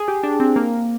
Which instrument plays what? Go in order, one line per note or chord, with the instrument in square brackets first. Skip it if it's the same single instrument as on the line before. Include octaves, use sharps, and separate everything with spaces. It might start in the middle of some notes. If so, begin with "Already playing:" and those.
Already playing: [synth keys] G#4
G4
D4
C4
A#3